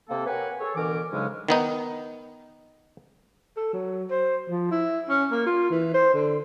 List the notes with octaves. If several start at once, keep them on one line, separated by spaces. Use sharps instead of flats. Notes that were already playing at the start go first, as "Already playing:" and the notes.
C3 A#3 A4
G4 A#4 B4 C#5 F#5 G#5
G#4 A4 C#5
B2 D3 E3 A#4 D6
D2 G#2 C#3 F#3 G#3 C#4
D#3 B3 D#4
A4
F#3
C5
F3
E4
C#4
A#3
F4
E3
C5
D3